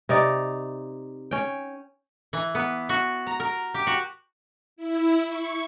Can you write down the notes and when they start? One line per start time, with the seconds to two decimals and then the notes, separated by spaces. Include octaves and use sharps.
0.09 C3 D#4 D5
1.31 C#4 G5
2.33 E3
2.55 B3
2.89 F#4
3.27 A#5
3.40 A#4
3.74 G4
3.87 F#4
4.76 E4
5.27 C#6